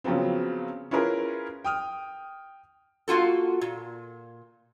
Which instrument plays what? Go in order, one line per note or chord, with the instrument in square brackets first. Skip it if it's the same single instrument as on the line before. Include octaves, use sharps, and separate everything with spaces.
[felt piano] C#3 F3 F#3 B3 C4
C#4 E4 F4 G#4 A#4 B4
G5 D#6 F6
[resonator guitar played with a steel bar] A#3 F4 F#4 A4
A#2